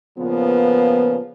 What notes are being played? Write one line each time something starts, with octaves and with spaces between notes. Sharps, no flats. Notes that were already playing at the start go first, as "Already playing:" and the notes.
A#2 C#3 F3 B3